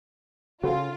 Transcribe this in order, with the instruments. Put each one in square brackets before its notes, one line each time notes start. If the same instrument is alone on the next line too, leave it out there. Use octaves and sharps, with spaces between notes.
[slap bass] C#3 [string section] F4 [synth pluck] F#4 A4